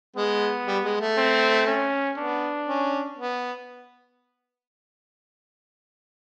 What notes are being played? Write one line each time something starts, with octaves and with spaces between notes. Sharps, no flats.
G#3 B3
G3
G#3
A3
C4
C#4
B3 D4
C#4
B3